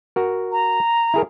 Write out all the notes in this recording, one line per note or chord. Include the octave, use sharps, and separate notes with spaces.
F#4 A#4
A#5
E4 G#4 A#4